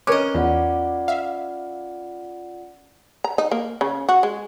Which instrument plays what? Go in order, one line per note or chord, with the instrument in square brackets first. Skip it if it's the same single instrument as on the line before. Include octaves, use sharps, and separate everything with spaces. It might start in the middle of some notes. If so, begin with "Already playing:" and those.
[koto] C#4 D#5 [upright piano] A#4 D6 [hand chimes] F#6
[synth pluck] E2 [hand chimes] F4 D5 F#5
[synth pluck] E5 F5
[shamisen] A#5
D#4
A#3
C#3
F#4
G#3